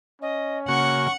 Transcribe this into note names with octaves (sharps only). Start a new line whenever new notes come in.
C#4 D#5
C#3 A#3 F#4 F#5 C#6